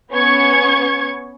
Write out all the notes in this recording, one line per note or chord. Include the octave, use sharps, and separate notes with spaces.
B3 C#4 C#6 G#6 C#7